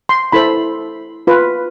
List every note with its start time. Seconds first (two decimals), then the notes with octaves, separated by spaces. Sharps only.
0.09 C6
0.32 E4 A4 C5 B5
1.27 F4 B4